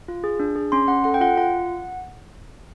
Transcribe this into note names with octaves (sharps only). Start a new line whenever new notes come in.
F4
G#4
D4
G#4
C#4 C6
C#4 F#5
A4 F#5
G5
F4 F#5
F4 F#5